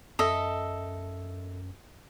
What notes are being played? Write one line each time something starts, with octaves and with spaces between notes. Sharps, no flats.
F#2 A4 D#5 E5